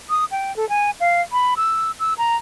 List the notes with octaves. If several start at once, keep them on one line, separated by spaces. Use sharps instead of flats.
D#6
G5
A4
G#5
F5
B5
E6
E6
A#5